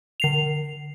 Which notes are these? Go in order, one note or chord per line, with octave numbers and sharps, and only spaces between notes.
D3 C7 F7